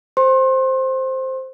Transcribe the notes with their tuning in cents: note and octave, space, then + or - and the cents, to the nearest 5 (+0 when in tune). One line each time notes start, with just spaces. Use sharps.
A4 -10 C5 +0 C6 +35